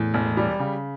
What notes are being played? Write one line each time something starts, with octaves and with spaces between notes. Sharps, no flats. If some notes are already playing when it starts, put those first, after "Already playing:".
Already playing: E2 A2
E1
G3
C#3